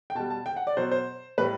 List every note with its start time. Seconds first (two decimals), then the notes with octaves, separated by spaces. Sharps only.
0.10 G5
0.15 B2 G3 A5
0.30 A5
0.46 G5
0.56 F#5
0.67 D5
0.77 B2 F#3 C5
0.91 C5
1.38 A2 G3 B4